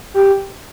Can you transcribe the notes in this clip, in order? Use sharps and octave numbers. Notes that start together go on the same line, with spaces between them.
G4